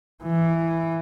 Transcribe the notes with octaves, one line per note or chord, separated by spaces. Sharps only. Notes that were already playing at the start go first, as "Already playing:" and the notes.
E3